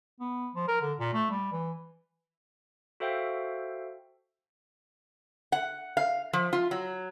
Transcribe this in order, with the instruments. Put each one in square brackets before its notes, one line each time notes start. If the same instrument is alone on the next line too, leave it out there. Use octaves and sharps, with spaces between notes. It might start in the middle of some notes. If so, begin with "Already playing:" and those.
[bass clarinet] B3
F3
A#4
D3
A#2
A3
G3
E3
[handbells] F#4 A4 C5 E5 F5 G5
[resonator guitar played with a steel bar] F#5
F5
F3
F4
F#3